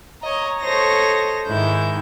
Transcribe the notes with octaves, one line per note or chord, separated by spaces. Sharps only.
C#5 D#5 A#5
A4 C5 C#5 D#5 A#6
G#2 D#3 G#3 E4 G6